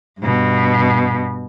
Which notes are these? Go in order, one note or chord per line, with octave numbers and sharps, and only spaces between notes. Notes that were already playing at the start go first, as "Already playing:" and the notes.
G2 B2